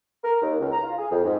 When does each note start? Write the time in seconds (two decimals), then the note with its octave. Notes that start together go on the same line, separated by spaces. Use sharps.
0.24 A#4
0.42 D#2
0.59 C#2
0.71 A#5
0.83 F4
0.98 G#4
1.10 F2
1.24 G#2